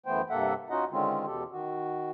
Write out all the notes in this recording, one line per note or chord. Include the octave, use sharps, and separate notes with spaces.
F#2 E3 A3 B3 C5 G5
G2 C3 A#3 A4 E5 F#5
C#4 D#4 F4 F#4 D#5 F#5
D3 D#3 G#3 C4 C#4 F4
E2 B2 G4 A4
D#3 F#4